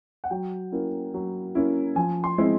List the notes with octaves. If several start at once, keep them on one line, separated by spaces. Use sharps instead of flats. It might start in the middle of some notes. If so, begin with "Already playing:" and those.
F#5
F#3 G5
A#3 C#4 E4
F#3
A#3 C#4 E4
F3 G#5
C6
G#3 C4 E4